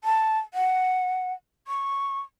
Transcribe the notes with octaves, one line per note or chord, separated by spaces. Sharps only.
A5
F#5
C#6